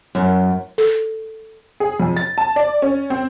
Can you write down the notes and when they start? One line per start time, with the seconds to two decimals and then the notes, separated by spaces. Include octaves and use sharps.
0.15 F#2
0.78 A4
1.80 G#4
2.00 F2
2.17 A6
2.38 A5
2.56 D5
2.82 C#4
3.10 C4